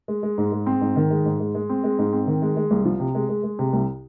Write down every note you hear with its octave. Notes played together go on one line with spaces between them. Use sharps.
G#3
G#3
G#2
G#3
C4
G#2
D#3
G#3
G#2
G#3
G#3
C4
G#3
G#2
C4
D#3
G#3
G#3
C2
F3
C3
G#3
G#3
G#3
C3
C2